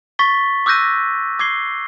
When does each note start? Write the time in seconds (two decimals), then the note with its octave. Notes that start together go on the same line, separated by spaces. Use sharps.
0.19 C#6 A6 B6 G7
0.66 D6 E6 F#6 G6 A#6 D#7
1.39 D6 G#6 C7 G7